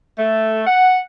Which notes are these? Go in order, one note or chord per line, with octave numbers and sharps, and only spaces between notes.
A3
F#5